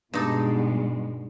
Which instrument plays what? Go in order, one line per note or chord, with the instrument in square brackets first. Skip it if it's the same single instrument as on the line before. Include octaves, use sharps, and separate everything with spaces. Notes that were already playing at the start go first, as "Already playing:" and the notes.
[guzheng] G2 D#4 A4 [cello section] B2 G3 G#3